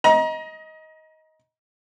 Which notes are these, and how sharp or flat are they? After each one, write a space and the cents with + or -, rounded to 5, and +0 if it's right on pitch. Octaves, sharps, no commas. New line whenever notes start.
D#5 +15 A#5 +30